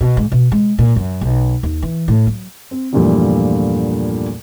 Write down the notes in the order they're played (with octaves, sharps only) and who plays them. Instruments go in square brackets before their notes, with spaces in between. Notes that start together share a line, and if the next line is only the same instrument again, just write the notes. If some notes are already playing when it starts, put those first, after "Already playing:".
[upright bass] B2
G#2
B2
G#3
A#2
F#2
B1
D#2
E3
A2
F#3
[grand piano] C4
E2 G2 A#2 F3 G3 A3